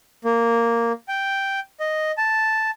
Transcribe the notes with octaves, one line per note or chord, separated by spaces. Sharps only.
A#3
G5
D#5
A5